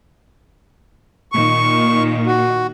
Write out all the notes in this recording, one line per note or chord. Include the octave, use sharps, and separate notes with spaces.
A#2 D#3 C#6
F#4